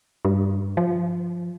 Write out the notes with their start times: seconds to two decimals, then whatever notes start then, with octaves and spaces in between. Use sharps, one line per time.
0.25 G2
0.77 F3